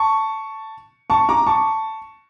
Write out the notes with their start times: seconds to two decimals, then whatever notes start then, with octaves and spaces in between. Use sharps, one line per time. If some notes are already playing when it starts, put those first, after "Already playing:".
Already playing: A5 C#6
1.10 A5 C#6
1.29 A#5 D6
1.46 A5 C#6